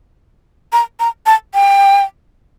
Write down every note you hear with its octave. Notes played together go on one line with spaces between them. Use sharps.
A#5
A#5
A5
G5